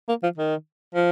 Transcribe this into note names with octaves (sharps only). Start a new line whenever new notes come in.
A#3
F3
D#3
F3